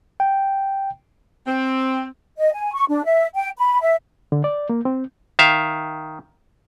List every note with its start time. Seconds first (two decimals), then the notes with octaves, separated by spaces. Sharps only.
0.20 G5
1.47 C4
2.38 D#5
2.53 G#5
2.74 C#6
2.89 D4
3.04 E5
3.35 G5
3.58 B5
3.82 E5
4.32 D3
4.44 D5
4.69 A#3
4.85 C4
5.39 D#3 E5 F5